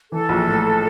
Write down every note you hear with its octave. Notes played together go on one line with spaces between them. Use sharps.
E3 A4
A#1
A2